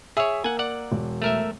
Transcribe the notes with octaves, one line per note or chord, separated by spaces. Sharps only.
G#4 C#5 E5 E6
A#3 F#5 G#5
D5 F#5
E1
A3 A#4 E5